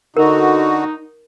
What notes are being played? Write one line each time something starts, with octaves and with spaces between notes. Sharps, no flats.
D3 D#4 F#4 A#4